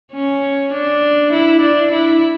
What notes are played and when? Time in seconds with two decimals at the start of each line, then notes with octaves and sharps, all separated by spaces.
0.13 C#4
0.73 D4
1.32 E4
1.61 D4
1.92 E4